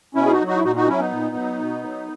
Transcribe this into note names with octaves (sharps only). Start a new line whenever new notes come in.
B2 C#4 E4
G#4
D#4 F#4
F#3
D#4 F#4
E4
A#2 D#4 F#4
D#4 F#4
F#3 C#4 E4
B3 D#4
A#2
F#3
B2
F#3